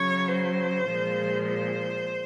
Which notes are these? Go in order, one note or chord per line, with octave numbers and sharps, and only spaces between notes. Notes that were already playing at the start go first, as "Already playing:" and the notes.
Already playing: C#3 F#3 C#5
C5
A#2 F3 G#3
C5